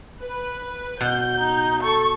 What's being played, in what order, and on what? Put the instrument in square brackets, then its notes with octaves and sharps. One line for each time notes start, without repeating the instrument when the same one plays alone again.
[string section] B4
[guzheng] B2 [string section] G6
[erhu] D#4
[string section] A4 [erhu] C#6